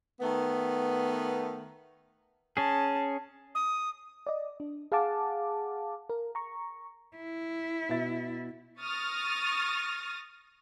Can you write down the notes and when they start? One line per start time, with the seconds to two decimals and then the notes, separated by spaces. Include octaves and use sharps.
0.20 D#3 A3 B3
2.57 C#4 G#4 A5
3.55 D#6
4.27 D5 D#5
4.60 D4
4.92 G#4 F5 F#5 A5 D6
6.10 A#4
6.35 A#5 C#6
7.17 E4
7.89 B2 E5 A6
8.80 C#6 D#6 F6 A6 A#6